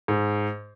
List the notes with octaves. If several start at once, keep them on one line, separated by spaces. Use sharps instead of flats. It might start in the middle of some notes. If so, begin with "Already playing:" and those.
G#2